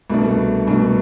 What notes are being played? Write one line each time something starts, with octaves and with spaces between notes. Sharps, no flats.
C2 B2 A3 D4
C2 B2 A3 D4